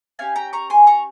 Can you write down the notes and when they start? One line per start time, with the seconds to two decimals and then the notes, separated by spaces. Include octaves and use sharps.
0.19 C#4 G4 F5 G#5
0.36 G5 A#5
0.53 A#5 C#6
0.70 G#5 C6
0.87 A#5 C#6